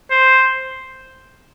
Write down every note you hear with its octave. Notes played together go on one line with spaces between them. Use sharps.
C5